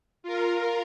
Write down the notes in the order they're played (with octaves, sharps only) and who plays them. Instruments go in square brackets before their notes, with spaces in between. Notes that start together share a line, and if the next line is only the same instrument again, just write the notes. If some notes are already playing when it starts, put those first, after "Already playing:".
[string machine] F4 A#4